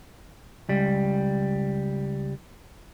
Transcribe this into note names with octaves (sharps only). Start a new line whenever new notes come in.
C#2 G3